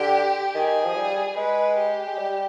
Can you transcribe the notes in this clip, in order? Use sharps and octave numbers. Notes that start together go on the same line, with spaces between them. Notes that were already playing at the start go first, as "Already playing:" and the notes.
Already playing: D3 G4
D#3 G#4
F3
G3
G#3 B4
G4
G#3
G3